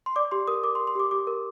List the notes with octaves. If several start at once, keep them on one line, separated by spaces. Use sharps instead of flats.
C6
D5 D6
G4 C6
A#4 D#6
A#4 D6
C6
A#4
C6
G4 D6
G4 D6
A#4